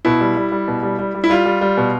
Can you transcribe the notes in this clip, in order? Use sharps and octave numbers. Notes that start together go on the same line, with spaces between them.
B2 E4
G3
G3
G3
B2
G3
G3
G3
E4
G3 F4
G3
G3
B2